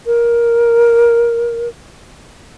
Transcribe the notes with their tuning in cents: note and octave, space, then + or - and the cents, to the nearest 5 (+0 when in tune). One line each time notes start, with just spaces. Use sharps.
A#4 +10